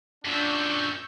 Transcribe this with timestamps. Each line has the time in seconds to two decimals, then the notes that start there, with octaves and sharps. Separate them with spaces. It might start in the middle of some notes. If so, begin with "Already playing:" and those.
0.25 F#2 A#2 D4 C#6 E6 G6